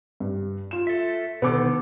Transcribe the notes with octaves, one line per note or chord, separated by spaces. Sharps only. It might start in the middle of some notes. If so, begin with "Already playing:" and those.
G2
F4 E7
A4 E5
B2 D3 D#3 B3 A4 D6